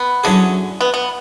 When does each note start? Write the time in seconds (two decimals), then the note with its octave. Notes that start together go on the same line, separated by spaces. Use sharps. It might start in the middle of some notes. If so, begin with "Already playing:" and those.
Already playing: B3
0.24 D3 F#3 C#4 E4 G#4
0.81 B3
0.94 B3